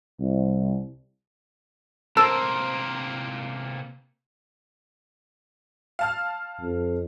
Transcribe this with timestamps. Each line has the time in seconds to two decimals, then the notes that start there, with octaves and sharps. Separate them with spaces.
0.19 C2
2.17 C3 A#3 A#4 C5 A5 E6
5.99 F5 A5 F6
6.61 F2